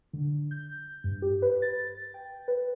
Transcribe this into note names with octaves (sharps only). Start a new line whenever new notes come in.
D3
G6
G2
G4
B4
A6
G5
B4